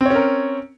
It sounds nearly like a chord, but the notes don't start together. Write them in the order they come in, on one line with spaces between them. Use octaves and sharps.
C4 C#5 C#4 A#4